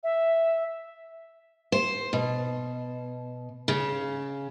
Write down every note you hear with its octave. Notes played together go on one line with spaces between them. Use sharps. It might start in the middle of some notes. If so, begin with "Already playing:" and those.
E5
C5
B2
C#3